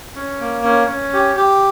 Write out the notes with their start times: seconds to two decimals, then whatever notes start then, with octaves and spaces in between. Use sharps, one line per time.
0.15 C#4
0.39 A#3
0.63 C#4
0.88 C#4
1.13 G4
1.37 G4